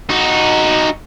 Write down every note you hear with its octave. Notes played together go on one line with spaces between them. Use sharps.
D#4 F#4